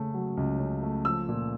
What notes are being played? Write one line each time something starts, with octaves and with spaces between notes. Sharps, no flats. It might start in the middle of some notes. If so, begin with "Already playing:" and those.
Already playing: C#3 A3
F#3
C#2
C#3
A3
F3 E6
A#2